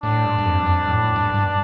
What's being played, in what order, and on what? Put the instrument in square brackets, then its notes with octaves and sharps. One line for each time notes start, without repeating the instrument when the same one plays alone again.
[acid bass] A2 [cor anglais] D4
[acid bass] G2
G2
F2
G2
F2
A2
G2
G2